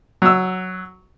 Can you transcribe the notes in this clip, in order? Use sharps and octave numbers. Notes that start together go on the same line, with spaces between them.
F#3 E6